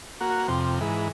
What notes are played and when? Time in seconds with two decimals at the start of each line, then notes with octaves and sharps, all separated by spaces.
0.21 A#3 F#4
0.48 F2 C3
0.81 G#2 E3